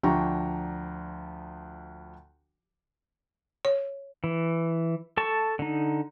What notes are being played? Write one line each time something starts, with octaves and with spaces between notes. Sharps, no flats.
D2 F3 D4 G5 A#5 C#6
C#5
E3
A4 A5 C#6
D3 D#4